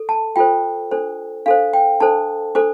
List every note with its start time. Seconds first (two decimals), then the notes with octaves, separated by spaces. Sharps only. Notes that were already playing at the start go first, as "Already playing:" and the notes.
Already playing: A4
0.09 A5
0.36 F4 A4 C5 G5
0.91 D4 A4 C5
1.46 D4 A4 C5 F5
1.73 G5
2.00 D4 A4 C5 A5
2.55 D4 A4 C5 D6